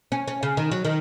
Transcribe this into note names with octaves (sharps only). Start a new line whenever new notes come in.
C#4
C#4
C#3
D#3
F#3
D#3